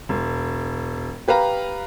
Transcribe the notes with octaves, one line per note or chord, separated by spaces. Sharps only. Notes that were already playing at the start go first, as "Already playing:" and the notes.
E1
G4 B4 F5 A#5